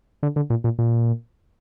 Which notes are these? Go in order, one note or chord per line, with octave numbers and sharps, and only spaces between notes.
D3
D3
A#2
A#2
A#2